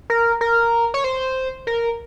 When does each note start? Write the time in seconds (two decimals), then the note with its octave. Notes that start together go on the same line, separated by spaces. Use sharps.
0.10 A#4
0.41 A#4
0.94 C#5
1.04 C5
1.67 A#4